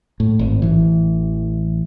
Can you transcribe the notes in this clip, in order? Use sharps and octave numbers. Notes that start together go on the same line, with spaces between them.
A2
G#1
A1 E3